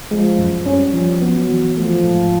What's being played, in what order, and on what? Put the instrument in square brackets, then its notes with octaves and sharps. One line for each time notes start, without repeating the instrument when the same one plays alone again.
[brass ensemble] F3 [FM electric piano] G#3
[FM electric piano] F#2
[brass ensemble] G3 [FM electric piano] C#4
[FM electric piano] F3
[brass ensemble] F#3 [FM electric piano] B3
[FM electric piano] E3
[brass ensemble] F3 [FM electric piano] A3
[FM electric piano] G#2